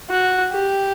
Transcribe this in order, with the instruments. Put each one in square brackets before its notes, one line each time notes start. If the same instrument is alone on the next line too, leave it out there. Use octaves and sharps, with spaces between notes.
[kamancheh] F#4
G4